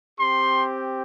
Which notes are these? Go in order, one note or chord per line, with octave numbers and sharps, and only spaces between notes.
C4 G4 C6